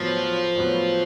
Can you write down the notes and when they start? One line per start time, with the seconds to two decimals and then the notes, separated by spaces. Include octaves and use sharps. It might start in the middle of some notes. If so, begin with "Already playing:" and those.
Already playing: A2 F3 F#3 B3
0.56 A2 F#3 B3